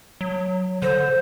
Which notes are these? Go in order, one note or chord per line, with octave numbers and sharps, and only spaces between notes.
F#3
D3 C5